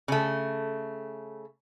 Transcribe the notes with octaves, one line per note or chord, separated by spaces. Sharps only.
C#3 A3